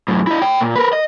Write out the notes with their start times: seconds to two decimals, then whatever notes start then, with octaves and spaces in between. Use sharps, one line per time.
0.08 F#2 A2
0.27 E4 D#5
0.42 C#5 G5
0.60 A#2
0.76 A#4 B4
0.93 D#5